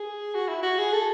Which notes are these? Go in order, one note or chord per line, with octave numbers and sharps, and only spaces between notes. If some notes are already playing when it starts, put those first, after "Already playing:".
Already playing: G#4
F#4
E4
F#4
G#4
A4